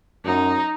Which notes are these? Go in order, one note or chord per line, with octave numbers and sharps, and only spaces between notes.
F#2 D#4